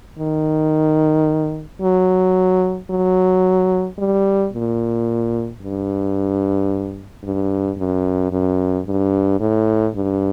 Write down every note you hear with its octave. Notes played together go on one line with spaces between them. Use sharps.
D#3
F#3
F#3
G3
A#2
G2
G2
F#2
F#2
G2
A2
G2